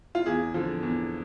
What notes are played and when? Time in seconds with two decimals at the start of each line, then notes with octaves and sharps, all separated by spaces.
0.15 F4
0.26 E2 G#4
0.54 D3 F3
0.83 E2